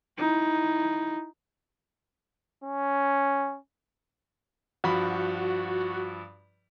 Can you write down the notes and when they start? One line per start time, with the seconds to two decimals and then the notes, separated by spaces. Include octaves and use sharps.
0.18 D#4 E4
2.64 C#4
4.84 G2 F3 F#4 B5